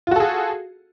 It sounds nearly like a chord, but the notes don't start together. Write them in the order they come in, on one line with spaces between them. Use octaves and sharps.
F4 F#4 A4 G#4